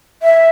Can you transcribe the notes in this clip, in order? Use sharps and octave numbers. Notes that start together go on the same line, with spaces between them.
E5